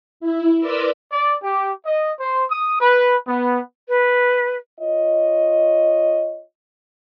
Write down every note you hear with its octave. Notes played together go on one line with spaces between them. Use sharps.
E4
A#4 B4 D5 C6 D6 E6
D5
G4
D#5
C5
D#6
B4
B3
B4
F4 C#5 D#5